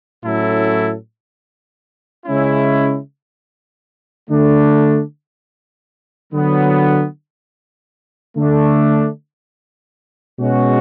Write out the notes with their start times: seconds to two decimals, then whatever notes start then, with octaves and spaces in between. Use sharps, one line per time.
0.23 A2 F#3 C#4 E4 A4
2.26 C#3 G#3 C#4 E4
4.30 D3 A3 D4
6.32 D3 F#3 B3
8.36 D3 A3 D4
10.40 B2 G#3 C#4 F#4